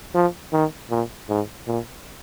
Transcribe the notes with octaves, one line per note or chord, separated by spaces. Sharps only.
F3
D#3
A#2
G#2
A#2